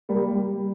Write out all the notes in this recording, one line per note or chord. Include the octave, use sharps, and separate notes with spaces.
G3 A#3
G3